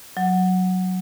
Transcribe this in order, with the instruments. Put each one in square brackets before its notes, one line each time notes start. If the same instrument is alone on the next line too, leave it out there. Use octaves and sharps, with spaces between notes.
[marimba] F#3